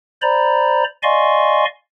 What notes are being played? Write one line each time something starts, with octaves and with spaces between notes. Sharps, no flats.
C5 D5 A#5 B5
D5 D#5 F5 G#5 C6 C#6